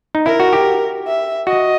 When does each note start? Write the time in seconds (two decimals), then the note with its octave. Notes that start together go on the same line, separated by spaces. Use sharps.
0.15 D#4
0.26 E4 A#4
0.40 F#4
0.53 G4
1.07 E5
1.47 F#4 D#5